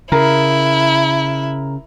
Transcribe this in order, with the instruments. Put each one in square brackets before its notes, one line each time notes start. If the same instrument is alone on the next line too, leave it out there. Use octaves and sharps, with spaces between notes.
[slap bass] C#3 [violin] E4 [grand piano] A#4